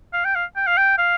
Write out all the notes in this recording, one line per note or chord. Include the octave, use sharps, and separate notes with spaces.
F5
G5
F5
G5
F5
G5
F5